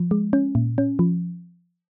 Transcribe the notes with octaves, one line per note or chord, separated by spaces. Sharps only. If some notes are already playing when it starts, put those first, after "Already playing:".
Already playing: F3
G#3
C#4
A#2
C#4
F3